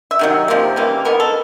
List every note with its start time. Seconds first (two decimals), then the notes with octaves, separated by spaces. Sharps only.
0.11 E5
0.19 C3 D#3 F#3
0.48 C3 F3 A#3
0.76 C#3 E3 G3 A#3
1.05 D#3 G#3 B3 A#4
1.20 A4